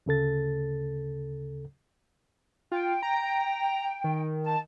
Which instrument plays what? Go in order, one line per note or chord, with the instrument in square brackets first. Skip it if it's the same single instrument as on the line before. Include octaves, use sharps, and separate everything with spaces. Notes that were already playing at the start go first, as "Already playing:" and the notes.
[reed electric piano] D2 C#3 A4 A6
[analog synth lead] F4 [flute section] G5
[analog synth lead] A#5
D#3
[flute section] A5